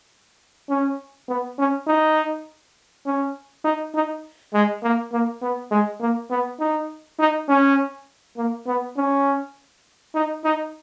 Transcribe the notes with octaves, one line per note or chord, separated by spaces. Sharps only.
C#4
B3
C#4
D#4
C#4
D#4
D#4
G#3
A#3
A#3
B3
G#3
A#3
B3
D#4
D#4
C#4
A#3
B3
C#4
D#4
D#4